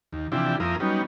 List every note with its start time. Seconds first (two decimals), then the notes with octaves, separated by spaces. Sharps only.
0.13 D#2
0.32 C3 E3 F3 D4 E4 G4
0.60 F2 F3 A#3 E4 A#4 D#6
0.80 F#3 G3 B3 C#4 D#4